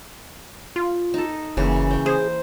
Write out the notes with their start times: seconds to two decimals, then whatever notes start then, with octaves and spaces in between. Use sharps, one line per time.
0.76 F4
1.14 D#4 A4
1.57 F#1 C#3 E3 A#3
1.90 C#5 G5
2.06 G#4 C5